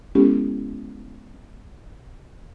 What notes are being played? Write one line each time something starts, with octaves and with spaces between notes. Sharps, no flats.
G#3 B3 C#4 E4 G4 A4